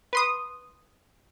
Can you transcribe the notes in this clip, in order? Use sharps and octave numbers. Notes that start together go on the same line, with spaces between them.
B4 C6 D#6